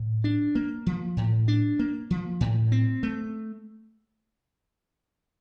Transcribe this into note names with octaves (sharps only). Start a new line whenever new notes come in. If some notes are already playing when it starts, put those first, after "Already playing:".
Already playing: A2
D4
A#3
F3
A2
D4
A#3
F3
A2
C4
A3